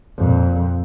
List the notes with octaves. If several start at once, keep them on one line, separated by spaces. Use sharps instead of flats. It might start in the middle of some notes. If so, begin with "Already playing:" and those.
F2 A#2